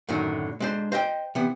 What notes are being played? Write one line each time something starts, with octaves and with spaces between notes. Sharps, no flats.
F#2 A2 D3 D#3 F#3
G#3 D4 C5
C5 D#5 F5 G5
C3 E3 B3